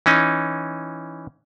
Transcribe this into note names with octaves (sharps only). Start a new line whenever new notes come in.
E3 C#4 D#4